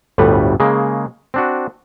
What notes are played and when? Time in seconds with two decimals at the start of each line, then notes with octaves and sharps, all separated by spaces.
0.18 G1 D2 A2 G3 B4
0.60 C#3 G#3 A#3
1.34 C4 D4 F#4